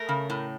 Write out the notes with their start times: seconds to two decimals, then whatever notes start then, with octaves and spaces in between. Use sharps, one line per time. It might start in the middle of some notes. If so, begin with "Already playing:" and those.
Already playing: A3 A#4
0.09 C#3
0.30 A2